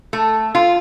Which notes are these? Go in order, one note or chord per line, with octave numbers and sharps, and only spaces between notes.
A3
F4